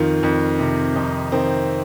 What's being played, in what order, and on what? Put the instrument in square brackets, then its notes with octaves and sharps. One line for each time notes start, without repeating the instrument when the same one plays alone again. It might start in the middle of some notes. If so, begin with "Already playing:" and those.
Already playing: [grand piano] F2 D#3 F4
F2
C3
F2 D#4
D#3 C4